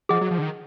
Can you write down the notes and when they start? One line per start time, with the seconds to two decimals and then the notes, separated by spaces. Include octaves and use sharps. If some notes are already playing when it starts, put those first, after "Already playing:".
0.09 F3 G#4 D#5 F#5
0.21 F#3
0.31 F3
0.38 D3
0.42 D#3